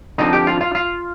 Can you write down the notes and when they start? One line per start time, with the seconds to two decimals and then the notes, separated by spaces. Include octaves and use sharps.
0.18 D3 F3 C4 D#4 F4 D#5
0.33 G4 G5
0.47 F4 F5
0.61 F4 F5
0.75 F4 F5